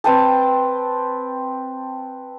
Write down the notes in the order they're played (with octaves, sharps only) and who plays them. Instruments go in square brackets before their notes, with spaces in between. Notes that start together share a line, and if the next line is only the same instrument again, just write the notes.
[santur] C4 B4 G5 A5